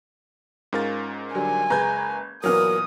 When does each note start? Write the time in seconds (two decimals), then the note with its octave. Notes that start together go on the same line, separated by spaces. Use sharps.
0.73 G#2 C#4 F4 A#4 A6
1.34 D3 F#3 G3 G#5
1.70 F#1 G#3 B4 A#5 G6 G#6
2.44 A#2 E3 F#3 B3 A#4 D#6 F6